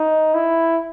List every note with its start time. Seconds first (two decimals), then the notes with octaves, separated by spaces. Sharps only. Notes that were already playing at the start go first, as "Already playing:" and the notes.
Already playing: D#4
0.35 E4